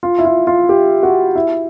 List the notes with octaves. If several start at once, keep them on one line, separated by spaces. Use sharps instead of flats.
F4
E4
F4
F4
G4
F#4
E4